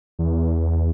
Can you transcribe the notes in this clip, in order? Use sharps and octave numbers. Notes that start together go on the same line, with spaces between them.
E2